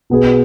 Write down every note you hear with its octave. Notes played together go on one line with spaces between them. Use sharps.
B2 B3 G#4 B4